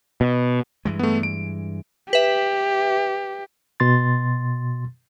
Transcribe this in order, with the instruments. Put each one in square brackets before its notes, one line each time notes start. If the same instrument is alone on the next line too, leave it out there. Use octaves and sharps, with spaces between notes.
[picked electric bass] B2
[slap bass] G2 E3 G#3
[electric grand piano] A3 B3
D7
[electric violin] G4 [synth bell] B4 E5
[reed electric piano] B2 C6 A6